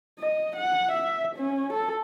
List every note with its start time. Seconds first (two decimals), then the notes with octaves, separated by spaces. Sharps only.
0.19 D#5
0.56 F#5
0.91 E5
1.36 C#4
1.73 A4